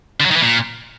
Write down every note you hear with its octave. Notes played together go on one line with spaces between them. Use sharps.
D3
F#3
D#3
E3
A#2